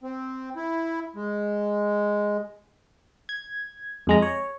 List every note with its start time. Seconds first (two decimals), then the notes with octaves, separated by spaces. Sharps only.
0.03 C4
0.56 E4
1.16 G#3
3.29 G#6
4.07 F2 G#3 A#5
4.22 C#5